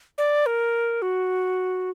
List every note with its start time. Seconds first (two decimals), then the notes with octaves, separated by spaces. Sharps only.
0.18 D5
0.46 A#4
1.02 F#4